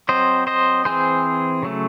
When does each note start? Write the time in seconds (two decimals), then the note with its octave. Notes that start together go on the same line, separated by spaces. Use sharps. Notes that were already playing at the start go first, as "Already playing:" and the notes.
0.09 F#3 C4 C5 D#5
0.47 C5 D#5
0.85 E3 C4 G#4 C5
1.62 C#3 F#3 A3